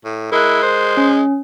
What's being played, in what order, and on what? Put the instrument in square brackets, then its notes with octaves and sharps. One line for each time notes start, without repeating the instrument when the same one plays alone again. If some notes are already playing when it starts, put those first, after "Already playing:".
[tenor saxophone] A2
[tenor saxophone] G#3 [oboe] E4 [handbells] A#4 F#6
[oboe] C5
[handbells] C#4